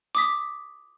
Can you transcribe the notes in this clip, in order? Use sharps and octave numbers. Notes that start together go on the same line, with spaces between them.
D6 D#6 B6